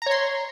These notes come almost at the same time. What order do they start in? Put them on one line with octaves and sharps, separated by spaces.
A#5 C#5 C6